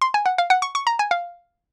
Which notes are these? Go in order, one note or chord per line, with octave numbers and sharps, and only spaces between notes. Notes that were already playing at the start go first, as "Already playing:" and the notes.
C6
G#5
F#5
F5
F#5
C#6
C#6
A#5
G#5
F5